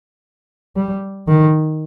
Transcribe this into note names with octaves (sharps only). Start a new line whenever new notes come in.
G3
D#3